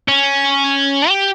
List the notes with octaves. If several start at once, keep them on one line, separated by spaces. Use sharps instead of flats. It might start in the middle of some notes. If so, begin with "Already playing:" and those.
C#4
G4